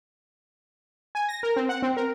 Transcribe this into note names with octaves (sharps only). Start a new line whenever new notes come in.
G#5
A#6
A#4
C4
F#5
C4
A#4